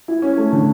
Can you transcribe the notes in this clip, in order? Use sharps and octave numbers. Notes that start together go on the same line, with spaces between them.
E4
C#4
A3
D3